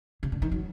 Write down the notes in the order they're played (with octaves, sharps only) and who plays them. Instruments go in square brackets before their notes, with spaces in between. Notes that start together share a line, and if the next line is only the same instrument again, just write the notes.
[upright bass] C#3
D3
D#3
F#3